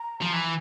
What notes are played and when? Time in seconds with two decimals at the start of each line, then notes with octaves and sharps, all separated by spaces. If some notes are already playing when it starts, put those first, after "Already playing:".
Already playing: A#5
0.22 F3
0.33 E3